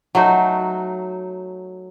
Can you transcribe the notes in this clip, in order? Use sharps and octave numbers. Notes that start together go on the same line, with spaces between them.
F#3 A3 D#4 F#4